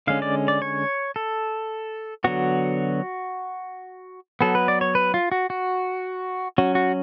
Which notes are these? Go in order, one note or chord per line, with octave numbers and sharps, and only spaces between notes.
D3 G#3 C#4 F5
D5
D5
C#5
A4
D3 F#3 B3 F#4
F#3 B3 A4
B4
D5
C#5
B4
F4
F#4
F#4
F#3 C#4 F#4
F#4